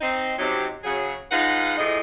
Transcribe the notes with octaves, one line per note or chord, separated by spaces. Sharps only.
C4 D#4
C3 F#3 C4 C#4 D#4 G4
C#3 F#3 G#4
G#3 D#4 F4 B4 F5 F#5
A2 F3 G#4 D#5